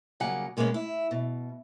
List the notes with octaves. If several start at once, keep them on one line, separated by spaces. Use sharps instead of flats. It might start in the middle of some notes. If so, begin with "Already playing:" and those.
C#3 F#3 G3 A#3 F#5 G#5
B2 G#3 A#3 B3 C#4
E4
B2